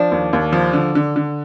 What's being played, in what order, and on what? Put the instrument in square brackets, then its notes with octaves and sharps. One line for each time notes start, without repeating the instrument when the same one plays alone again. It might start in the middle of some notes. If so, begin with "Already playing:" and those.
Already playing: [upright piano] F3 [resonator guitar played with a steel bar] D4
[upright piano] D#2
D#2
F3
D3
D3
D3